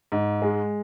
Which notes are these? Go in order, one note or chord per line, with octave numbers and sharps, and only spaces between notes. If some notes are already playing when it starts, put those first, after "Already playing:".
G#2
G#3